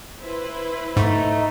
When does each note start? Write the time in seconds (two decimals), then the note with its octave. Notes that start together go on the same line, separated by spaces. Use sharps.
0.22 E4 B4 C5
0.97 G#2 A3 D#4